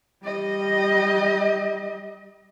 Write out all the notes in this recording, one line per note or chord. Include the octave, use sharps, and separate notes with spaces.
G3 D#5